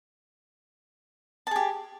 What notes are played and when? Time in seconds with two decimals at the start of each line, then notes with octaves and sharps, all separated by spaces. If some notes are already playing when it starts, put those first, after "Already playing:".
1.47 A5
1.51 G#4
1.56 G4